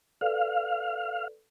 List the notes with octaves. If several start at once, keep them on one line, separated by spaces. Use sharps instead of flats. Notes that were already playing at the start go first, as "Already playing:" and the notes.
A4 B4 D5 F5